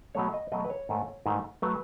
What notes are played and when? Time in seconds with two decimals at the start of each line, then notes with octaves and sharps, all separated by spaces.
0.15 B2 F#3 A3 C#5
0.34 D#5
0.52 B2 F#3 A3 D#5
0.65 B4
0.70 C#5
0.89 G#2 D#3 A3
1.26 G#2 D#3 A3
1.62 F#3 A3 B4